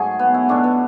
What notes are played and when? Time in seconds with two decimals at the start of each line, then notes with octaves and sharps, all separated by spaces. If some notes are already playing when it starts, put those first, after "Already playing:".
Already playing: G#2 F#3 A3 G#4
0.19 B3
0.34 E4
0.49 B2 A3 D4
0.64 B3